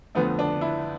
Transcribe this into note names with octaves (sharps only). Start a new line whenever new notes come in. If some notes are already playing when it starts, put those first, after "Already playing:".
F2 D3 A3 B3
D4
E4